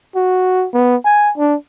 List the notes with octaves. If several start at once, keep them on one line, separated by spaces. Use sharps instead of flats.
F#4
B3
G#5
D4